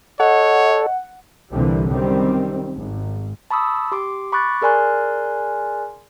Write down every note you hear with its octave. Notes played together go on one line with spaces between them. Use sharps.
A4 C#5 D#5 F#5
C2 A#2 D3 E3 G3 C4
F#2 D#3 G3 C4
G#1
A5 B5 C#6 D#6 E6
G4 C6 D6
B5 C#6 D6 F#6 A6
G#4 A#4 D5 G#5 C6 F#6